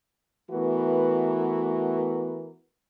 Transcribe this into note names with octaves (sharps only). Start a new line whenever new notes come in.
E3 A3 B3 F#4 A#4 B4